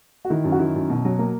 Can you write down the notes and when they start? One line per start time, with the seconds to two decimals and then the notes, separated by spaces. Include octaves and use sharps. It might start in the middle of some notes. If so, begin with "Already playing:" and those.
0.25 F#4
0.30 D#3 E4
0.44 F#2
0.52 F#4
0.59 D#3 E4
0.75 F#2
0.90 B2
1.05 F#3
1.19 A#3